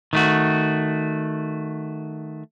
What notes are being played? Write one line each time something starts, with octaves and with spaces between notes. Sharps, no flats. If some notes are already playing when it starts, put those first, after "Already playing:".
D#3 A3 F#4